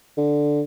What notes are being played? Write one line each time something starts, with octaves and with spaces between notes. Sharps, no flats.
D3